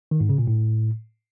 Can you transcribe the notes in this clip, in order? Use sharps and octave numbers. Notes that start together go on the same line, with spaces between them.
D#3
G#2
C#3
A#2
A2